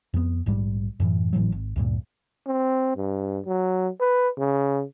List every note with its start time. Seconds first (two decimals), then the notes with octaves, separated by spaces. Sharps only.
0.14 F2 B3
0.46 A#1 G#2 G3
1.00 F#2 A2 E3
1.33 G#1 A2 E3 F#3
1.52 G#1
1.76 D2 G2 A#2
2.47 C4
2.97 G2
3.46 F#3
4.00 B4
4.38 C#3